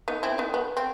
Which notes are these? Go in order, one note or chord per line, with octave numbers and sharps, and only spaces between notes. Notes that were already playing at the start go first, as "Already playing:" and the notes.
B3 D#4
C4 E4
B3 D#4
B3
C4